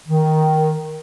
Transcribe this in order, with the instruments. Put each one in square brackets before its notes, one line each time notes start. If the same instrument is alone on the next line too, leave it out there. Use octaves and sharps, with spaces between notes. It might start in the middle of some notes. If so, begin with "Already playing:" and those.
[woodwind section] D#3